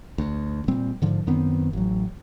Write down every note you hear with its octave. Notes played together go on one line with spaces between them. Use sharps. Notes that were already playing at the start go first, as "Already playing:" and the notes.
D2
A#2 G3 C4
G#2 D3 F3
F#2 D#3 B3 C4
A1 F#3